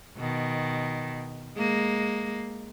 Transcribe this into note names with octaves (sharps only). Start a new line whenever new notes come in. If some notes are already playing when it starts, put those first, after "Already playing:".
B2 D#3
G#3 A#3